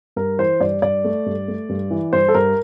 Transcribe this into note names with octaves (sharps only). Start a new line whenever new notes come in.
G2 A#4
E3 C5
G2 D5
G2 D5
A3
G2
A3
G2
E3
G2 C5
A4
G2 A#4